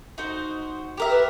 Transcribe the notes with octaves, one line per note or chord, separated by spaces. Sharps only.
D#4 F#4 C5
G4 A#4 E5
B4